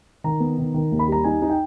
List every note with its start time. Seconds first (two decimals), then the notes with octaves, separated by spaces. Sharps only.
0.24 D#3 A#5
0.40 B3
0.58 D#3
0.74 D#3
0.92 D#2
0.99 B5
1.08 G3 A#5
1.24 D#4 G#5
1.42 D#4
1.49 G5